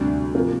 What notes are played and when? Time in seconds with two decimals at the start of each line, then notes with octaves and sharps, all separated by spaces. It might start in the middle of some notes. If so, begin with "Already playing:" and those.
Already playing: D2 C3 G3 D4
0.35 C3 F3 A#3 F4